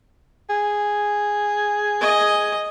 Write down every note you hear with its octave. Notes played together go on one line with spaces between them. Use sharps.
G#4
D#5